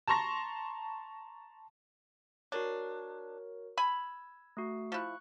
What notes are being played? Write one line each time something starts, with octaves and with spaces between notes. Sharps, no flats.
A5 A#5 C6 C#6 A#6
D4 F#4 A#4 C#5
G#5 B5 E6 G#6
A3 F#4
F3 E4 C#6 F#6